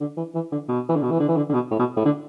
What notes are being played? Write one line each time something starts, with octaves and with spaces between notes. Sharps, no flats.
D3
E3
E3
D3
B2
E3
D3
B2
E3
D3
E3
D3
D3
B2
A2
B2
A2
D3